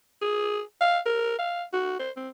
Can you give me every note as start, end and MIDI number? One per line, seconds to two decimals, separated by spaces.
0.22 0.61 68
0.81 0.99 77
1.05 1.37 70
1.39 1.63 77
1.73 1.98 66
1.99 2.10 72
2.17 2.29 60